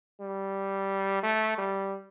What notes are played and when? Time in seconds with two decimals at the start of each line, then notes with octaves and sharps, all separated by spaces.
0.21 G3
1.23 A3
1.58 G3